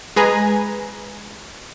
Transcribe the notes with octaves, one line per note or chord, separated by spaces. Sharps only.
G#3 G#4 B4 G#5 A#5